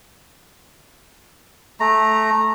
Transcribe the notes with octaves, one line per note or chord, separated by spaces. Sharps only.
A3 A#5